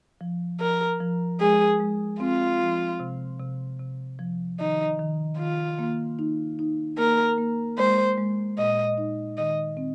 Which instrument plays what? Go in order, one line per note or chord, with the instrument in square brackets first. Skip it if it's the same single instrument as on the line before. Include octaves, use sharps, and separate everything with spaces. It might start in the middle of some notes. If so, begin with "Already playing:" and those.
[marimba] F3
[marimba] F3 [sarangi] A#4
[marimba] F3
[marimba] G#3 [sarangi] G#4
[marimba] G#3
[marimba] C4 [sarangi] F4
[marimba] F3
C3
C3
C3
F3
[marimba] D#3 [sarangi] D#4
[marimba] D#3
[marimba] D#3 [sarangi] F4
[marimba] A#3
D#4
D#4
[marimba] A#3 [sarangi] A#4
[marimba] A#3
[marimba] G#3 [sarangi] C5
[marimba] G#3
[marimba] A#2 [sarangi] D#5
[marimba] D#4
[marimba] D#3 [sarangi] D#5
[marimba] C4